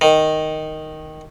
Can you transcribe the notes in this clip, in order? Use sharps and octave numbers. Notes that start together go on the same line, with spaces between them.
D#3